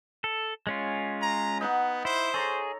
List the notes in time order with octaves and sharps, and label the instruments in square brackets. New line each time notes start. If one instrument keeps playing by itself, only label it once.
[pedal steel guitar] A4
G#3 C#4 F4
[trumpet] A#5
[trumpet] B3 [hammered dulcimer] D#4 F#5
[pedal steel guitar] E4 [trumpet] C5
[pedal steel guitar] G#4 [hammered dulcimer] A4 C#5 A#5